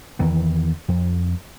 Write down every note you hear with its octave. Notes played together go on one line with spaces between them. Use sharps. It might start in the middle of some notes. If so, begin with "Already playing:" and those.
E2 D#3 E3
F2